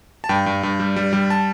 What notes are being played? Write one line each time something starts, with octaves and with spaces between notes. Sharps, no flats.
A5
G2 G5
G2
G2
G3
G3
G3
A5